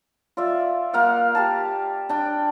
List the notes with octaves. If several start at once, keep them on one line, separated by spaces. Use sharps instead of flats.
F4 D5 E5
A#3 F5 F#5
G4 F5 A5
D4 G5